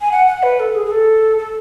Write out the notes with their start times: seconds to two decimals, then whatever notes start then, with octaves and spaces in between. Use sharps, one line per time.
0.01 G#5
0.12 F#5
0.27 F#5
0.43 B4
0.60 A4
0.75 G#4
0.86 G#4
0.91 A4
1.38 A4